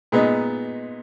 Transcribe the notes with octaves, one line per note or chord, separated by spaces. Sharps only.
A#2 G#3 B3 D#4